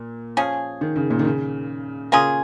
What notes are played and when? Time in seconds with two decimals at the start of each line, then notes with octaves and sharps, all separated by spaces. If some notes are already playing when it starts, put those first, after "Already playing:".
Already playing: A#2
0.37 F3 C#4 G#4
0.81 D#3
0.96 C#3
1.10 A#2
1.19 D#3
1.25 C#3
2.12 C#3 A#3 C#4 F4 G#4